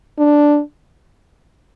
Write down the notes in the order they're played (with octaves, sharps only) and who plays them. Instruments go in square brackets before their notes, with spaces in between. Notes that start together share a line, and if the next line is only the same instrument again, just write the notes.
[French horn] D4